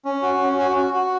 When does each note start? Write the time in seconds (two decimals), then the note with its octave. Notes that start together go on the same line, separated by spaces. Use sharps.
0.05 C#4
0.22 F#4
0.41 C#4
0.59 F#4
0.77 F#4
0.94 F#4